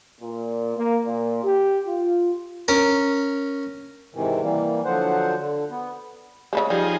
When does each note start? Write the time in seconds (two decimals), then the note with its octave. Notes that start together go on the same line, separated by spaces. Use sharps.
0.21 A#2
0.75 A#3
1.04 A#2
1.44 G4
1.86 F4
2.68 C#4 A#4
4.14 G#2 C3 D#3 E3
4.42 E3 G3 A#3
4.85 D3 F3 F#3 C5 F#5
5.39 D3
5.71 B3
6.53 C#3 G3 G#3
6.70 F3 G3 D#4 G#4